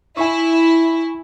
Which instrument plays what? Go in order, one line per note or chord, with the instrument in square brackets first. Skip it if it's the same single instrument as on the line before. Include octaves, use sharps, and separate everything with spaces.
[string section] E4 [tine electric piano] G#5 C#6